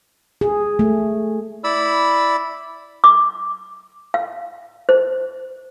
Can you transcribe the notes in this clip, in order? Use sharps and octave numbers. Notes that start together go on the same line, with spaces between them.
G#4
A3
E4 D5 B5 E6
D6
F5
C5